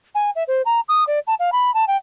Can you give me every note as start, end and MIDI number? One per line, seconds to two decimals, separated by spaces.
0.15 0.30 80
0.35 0.44 76
0.48 0.62 72
0.65 0.80 82
0.89 1.04 87
1.07 1.19 74
1.27 1.34 81
1.39 1.50 77
1.52 1.73 83
1.74 1.85 81
1.88 1.96 79